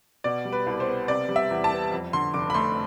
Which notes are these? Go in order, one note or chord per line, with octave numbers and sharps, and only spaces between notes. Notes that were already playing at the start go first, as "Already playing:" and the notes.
B2 D5
G3
B4
C2
C5
B3
C3 D5
G3
E5
E2
A5
B3
F2
D3 C6
F1 D6
B5
A3 C6